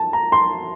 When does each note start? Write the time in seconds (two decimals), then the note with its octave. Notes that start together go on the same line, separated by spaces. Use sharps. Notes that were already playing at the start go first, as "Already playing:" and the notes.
Already playing: A5
0.13 A#5
0.32 C6